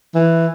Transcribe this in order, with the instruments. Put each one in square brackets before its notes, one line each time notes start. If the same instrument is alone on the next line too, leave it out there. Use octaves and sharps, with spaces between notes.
[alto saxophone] E3